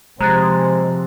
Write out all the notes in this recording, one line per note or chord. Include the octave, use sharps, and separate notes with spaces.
C3 F3 G#3 C5 A#5 F#6 A6